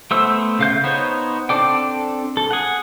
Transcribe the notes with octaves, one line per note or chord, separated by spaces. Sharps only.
A3 B3 C5 E6
C#3 F5 G6
B3 D#4 C5 C#5
C4 D4 A4 D5 G5
A4
G#4 F#5